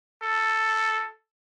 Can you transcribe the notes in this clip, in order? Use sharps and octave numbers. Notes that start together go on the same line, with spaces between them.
A4